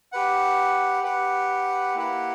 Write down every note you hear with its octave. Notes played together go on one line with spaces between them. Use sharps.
G4 B4 F#5
G4 B4 F#5
A#3 E4 G4 B4 F#5